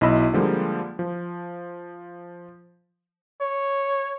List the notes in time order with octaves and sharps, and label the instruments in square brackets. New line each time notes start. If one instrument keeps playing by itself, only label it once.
[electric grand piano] B1 E4 D#5 B5 E6
D3 F3 G3 G#3 A#3
F3
[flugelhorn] C#5